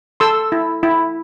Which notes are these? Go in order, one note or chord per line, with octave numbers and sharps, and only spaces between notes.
A4 C6 E6
E4
E4